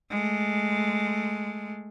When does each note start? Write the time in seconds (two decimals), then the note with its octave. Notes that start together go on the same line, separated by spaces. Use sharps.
0.11 G#3 A3